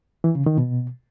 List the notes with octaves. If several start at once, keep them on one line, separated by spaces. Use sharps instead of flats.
E3
C#3
D#3
B2